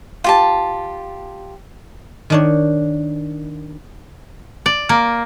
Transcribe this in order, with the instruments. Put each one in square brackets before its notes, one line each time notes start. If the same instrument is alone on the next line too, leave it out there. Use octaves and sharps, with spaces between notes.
[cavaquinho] F4 G4 A5
[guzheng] D#3 D4 C#5
[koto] D5
A#3